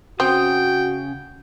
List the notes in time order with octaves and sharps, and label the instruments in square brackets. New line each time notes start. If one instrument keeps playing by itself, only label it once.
[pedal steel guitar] C#3 C#4 D#6 [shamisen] C4 [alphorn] F#4 [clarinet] G5